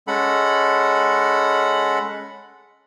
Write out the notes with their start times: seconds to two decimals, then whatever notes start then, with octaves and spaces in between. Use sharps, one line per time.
0.08 G#3 C#4 A4 F#5 B5